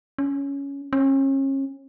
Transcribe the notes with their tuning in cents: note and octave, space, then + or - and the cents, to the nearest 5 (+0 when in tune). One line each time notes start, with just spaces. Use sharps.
C#4 +10
C#4 -35